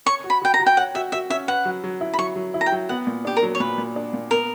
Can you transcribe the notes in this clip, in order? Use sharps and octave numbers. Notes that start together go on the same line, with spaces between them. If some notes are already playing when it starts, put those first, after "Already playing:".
C#5 C#6
F#4
B5
F#4 G5
A#5
F#4
G5
C#5 F#5
F#4 E5
F#4 E5
C#4 E5
B4 F#5
F#3
F#3
E4
B5
F#3 C#6
F#3
E4
A#5
G5
F#3
B3 F#5
A#2
D4 G4
A#4
F#3
C#5
A#2 B4
A#2
D4
A#2
B3 A#4